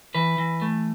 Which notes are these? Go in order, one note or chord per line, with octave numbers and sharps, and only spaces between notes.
E3 B4
E3
A3